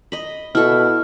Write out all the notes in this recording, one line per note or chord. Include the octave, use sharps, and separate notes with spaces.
D#5 B5
B2 E4 A4 F6